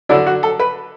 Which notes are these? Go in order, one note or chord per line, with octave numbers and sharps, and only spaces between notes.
D3 F#3 D4 E4
F#4
A4
B4